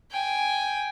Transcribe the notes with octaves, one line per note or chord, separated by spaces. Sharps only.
G5 G#5